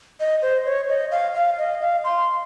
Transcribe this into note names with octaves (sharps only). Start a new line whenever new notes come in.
D#5
C5
C#5
D#5
F5
F5
D#5
F5
C6